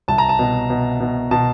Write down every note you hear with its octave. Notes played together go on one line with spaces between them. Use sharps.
C2 A5
A#5
A5
B2
B2
B2
B2 A5